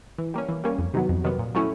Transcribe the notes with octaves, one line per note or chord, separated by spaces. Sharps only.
E3
G3 A#3 C#4
E3
G3 A#3 C#4
F2
C3 D#3 F#3 B3
F2
C3 D#3 F#3 B3
A#2
F#3 A3 C#4 E4